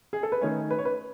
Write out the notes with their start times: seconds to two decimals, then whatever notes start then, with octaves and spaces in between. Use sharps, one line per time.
0.13 G#4
0.23 A4
0.32 B4
0.41 D#3 A3 C#4 C#5
0.71 B4
0.78 C#5
0.85 B4